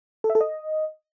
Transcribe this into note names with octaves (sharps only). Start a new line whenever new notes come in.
A4
E5
A4
D#5